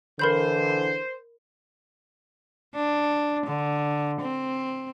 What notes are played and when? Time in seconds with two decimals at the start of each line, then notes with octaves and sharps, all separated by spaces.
0.19 D3 E3 A#4 C5 B5 G6
2.75 D4
3.46 D3
4.21 C4